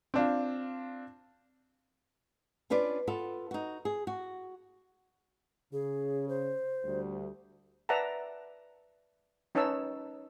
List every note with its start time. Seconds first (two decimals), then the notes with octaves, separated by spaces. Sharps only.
0.14 C4 D4 F4
2.70 C#4 D4 F4 B4 D5
3.07 B3 F4 A4
3.51 D#4 F#4
3.85 G#4
4.07 F#4
5.73 C#3 G#4
6.29 C5
6.84 D2 G3
7.89 B4 D5 E5 F#5 A5 A#5
9.55 C#4 D#4 B4 C#5 A5 E6